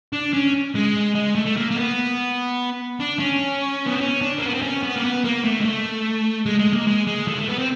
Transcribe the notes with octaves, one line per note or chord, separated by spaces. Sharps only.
D4
C#4
G#3
G#3
A3
A3
A#3
A#3
B3
D4
C#4
B3
C4
C#4
D4
A#3
B3
C4
C#4
B3
A#3
B3
A#3
A3
G#3
A3
G#3
G#3
A#3
G#3
G#3
A3
G#3
A3
B3
C4